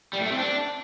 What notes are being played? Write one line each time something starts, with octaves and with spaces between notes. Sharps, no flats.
G3
A2
A3
C4
D4